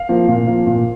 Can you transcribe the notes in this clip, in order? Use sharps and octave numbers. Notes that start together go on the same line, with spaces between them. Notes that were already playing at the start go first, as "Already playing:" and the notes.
Already playing: F5
F3 A#3
A#2
F3 A#3
A#2